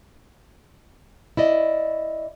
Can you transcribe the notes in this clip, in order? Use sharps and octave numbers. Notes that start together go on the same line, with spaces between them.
E4 D5 D#5